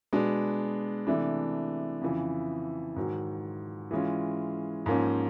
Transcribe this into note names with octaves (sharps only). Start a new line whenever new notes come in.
B2 G#3 B3 D4
C3 E3 A3 D4
F2 C#3 E3
G#2 D#3 F#3
E3 G#3 C#4 F4
G#2 F3 A#3 C#4